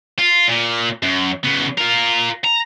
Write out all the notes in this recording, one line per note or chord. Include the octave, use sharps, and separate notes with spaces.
F4
A#2
F#2
C#3 B3
F4 A#4
A#5